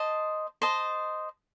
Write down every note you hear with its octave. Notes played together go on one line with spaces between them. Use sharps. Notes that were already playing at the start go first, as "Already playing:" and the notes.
Already playing: C5 D#5 A5
C5 D#5 A5